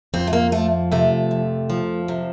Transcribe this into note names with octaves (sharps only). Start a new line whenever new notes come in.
F2 C4
A3
A#3
F3 A3
C3 A3
F2
F3
C3